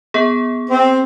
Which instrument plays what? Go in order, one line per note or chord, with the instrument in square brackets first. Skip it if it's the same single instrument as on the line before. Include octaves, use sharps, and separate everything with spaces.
[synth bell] B3 G#4
[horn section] C4